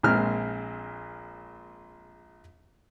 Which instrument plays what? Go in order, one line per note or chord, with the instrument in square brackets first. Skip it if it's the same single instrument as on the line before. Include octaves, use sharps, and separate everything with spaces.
[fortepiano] A#1 A#2 G#3 C4 F6